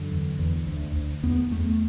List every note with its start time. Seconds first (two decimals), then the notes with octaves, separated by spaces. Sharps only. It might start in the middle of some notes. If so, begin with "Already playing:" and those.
Already playing: F#2 D3
0.11 E2
0.39 E2
0.67 D2
0.96 D2
1.23 E2 B3
1.51 E2 A3